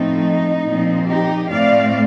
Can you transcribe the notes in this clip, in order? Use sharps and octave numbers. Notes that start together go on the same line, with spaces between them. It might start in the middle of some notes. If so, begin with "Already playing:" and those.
Already playing: A2 F3 A3 C4 D#4
A#2 F3 C4
D#4 G4
A2 A3 C4 D5 F5